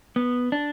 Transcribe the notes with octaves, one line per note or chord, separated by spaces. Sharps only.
B3
D4